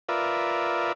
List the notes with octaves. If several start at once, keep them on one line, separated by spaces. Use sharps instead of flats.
F4 A#4 B4 D5 E5